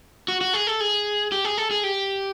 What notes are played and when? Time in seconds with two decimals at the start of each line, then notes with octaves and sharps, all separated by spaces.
0.28 F#4
0.41 F#4
0.54 G#4
0.67 A4
0.80 G#4
1.32 G4
1.45 G#4
1.58 A4
1.71 G#4
1.84 G4